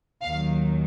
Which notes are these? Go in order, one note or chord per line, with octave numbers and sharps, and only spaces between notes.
D#2 D#3 F#3 F5